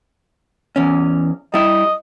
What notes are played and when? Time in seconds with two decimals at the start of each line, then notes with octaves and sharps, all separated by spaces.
0.76 E2 C#4
1.54 G3 E4 D#5